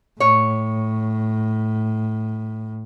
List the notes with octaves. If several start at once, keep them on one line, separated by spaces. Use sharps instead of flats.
A2 C#5